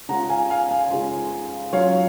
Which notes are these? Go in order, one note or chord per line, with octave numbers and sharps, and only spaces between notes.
C#3 G#3 C#4 F4 F#5 A#5
F5 G#5
F5 G#5
F5 G#5
C#3 G#3 C#4 F4
F#3 C#4 F4 C#5 F5